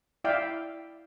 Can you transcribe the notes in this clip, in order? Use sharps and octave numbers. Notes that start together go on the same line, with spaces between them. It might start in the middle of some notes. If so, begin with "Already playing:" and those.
E4 D5 E5 F5 G5